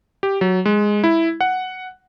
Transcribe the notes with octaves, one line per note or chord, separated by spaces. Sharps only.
G4
F#3
G#3
E4
F#5